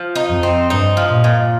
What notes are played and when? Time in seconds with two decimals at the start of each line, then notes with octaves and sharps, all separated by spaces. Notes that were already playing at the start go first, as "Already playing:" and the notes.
Already playing: F3
0.15 D#4
0.30 F2
0.43 C4
0.70 G2 D#4
0.97 F3
1.10 A#2
1.24 A#2